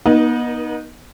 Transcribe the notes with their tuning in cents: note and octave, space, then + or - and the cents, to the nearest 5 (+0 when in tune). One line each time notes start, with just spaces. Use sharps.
B3 -35 D#4 +0 A#4 +35